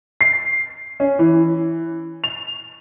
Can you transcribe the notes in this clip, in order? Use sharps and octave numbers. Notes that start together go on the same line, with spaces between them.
C7
C#4
E3
F7